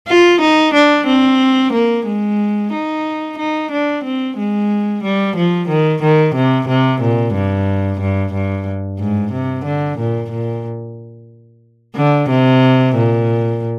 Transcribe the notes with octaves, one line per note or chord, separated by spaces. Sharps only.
F4
D#4
D4
C4
A#3
G#3
D#4
D#4
D4
C4
G#3
G3
F3
D#3
D#3
C3
C3
A#2
G2
G2
G2
G#2
C3
D3
A#2
A#2
D3
C3
A#2